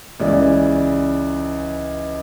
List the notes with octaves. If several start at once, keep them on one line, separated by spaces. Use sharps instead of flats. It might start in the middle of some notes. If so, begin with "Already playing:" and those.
C#2 C#3 E3 D5